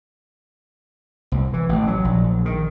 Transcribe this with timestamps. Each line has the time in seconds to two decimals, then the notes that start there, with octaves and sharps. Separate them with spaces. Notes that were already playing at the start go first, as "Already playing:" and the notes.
1.32 C2
1.54 E3
1.69 A1
1.87 F#3
2.05 A#1
2.45 D#3